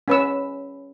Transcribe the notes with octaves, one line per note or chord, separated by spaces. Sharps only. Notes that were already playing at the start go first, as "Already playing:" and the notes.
C#4 B4 E6